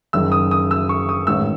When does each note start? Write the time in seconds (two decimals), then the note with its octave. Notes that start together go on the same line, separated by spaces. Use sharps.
0.13 F#1 F#2 D#3 E6
0.32 D#6
0.51 D#6
0.71 E6
0.89 C#6
1.09 D#6
1.27 A1 G#2 D#3 E6